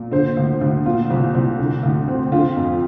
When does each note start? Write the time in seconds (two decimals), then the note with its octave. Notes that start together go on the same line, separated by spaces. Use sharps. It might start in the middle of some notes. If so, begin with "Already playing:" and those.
Already playing: A#2
0.11 D3 C5
0.37 D2
0.61 D2
0.85 A#2 F4
1.10 C2
1.35 C2
1.58 D3
1.83 D2
2.08 C4
2.32 D3 F4
2.56 F2